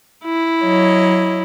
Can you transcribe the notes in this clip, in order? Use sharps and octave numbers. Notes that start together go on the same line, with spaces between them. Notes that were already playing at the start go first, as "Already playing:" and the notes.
E4
F#3 C#5 D#5